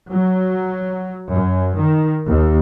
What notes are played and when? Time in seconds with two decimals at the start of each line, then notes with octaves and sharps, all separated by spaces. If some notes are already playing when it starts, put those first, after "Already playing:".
0.10 F#3
1.32 F#2
1.79 D#3
2.27 D#2